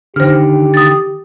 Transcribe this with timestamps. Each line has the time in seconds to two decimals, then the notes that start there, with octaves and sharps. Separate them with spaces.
0.16 D3 D#3 G4 C5 F6
0.74 D#6 A6